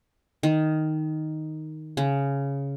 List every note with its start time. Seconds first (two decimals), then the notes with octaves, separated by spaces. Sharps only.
0.43 D#3
1.97 C#3